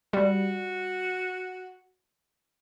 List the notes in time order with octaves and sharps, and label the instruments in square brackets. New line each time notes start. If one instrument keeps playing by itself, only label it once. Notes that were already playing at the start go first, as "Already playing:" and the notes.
[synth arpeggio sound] G3 [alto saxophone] F#4